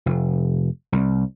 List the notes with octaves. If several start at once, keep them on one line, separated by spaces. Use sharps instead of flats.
F1
C2